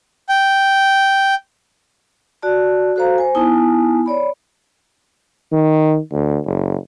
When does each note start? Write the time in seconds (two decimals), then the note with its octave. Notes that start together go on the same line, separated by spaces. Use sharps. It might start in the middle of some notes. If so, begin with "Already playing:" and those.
0.29 G5
2.42 F#4 D5 A5
2.96 F#4 A4 C5 F5 A#5
3.18 C5 G#5
3.35 B3 D#4 E4 G#5 A5
4.06 C#5 D5 B5
5.52 D#3
6.12 D2
6.46 F#1